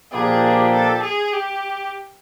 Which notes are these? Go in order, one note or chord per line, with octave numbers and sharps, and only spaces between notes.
A#2 F3 A#3 D4 G4 G#4
A4
G#4
G4